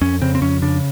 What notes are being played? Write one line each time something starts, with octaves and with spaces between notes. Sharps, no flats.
F2 C#4
C#3 C4
C4
F2 C#4
C#3 D4